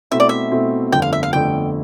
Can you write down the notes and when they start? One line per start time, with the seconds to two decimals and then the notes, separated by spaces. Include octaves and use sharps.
0.11 B2 A3 C4 E4 E5
0.20 D5
0.29 E5
0.52 B2 A3 C4 E4
0.92 G1 F2 D3 A3 G5
1.02 F5
1.13 E5
1.23 F5
1.33 G1 F2 D3 A3 G5